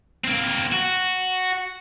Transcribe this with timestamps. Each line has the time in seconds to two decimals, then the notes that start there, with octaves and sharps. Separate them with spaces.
0.24 A#3 C4
0.73 F#4